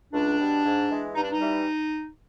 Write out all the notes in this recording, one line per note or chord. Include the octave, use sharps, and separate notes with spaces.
C#2 D4
B2 G3
G#2
E3 G#3
G2 D#4
D4
D#4
E3 G3